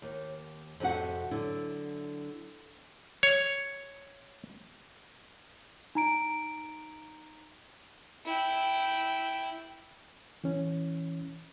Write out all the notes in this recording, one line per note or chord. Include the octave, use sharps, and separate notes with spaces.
D#2
F2 C3 D#4 F#4 F#5
D3 F#3 E4
C#5
D#4 A#5 D7
E4 G5
E3 C#4